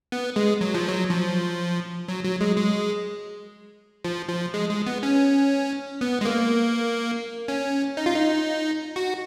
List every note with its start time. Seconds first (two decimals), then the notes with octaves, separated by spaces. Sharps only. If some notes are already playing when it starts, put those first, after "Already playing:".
0.12 B3
0.36 G#3
0.61 F#3
0.75 F3
0.88 F#3
1.10 F3
2.08 F#3
2.24 F#3
2.41 G#3
2.57 G#3
4.04 F3
4.29 F3
4.54 G#3
4.69 G#3
4.86 B3
5.03 C#4
6.01 B3
6.21 G#3
6.25 A#3
7.48 C#4
7.97 D#4
8.06 F4
8.15 D#4
8.96 F#4